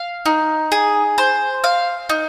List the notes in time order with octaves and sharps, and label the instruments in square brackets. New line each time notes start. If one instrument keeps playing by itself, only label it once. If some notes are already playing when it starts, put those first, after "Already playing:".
Already playing: [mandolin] F5
D#4
G#4
C5
F5
D#4